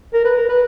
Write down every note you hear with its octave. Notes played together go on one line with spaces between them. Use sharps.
A#4
B4
A#4
B4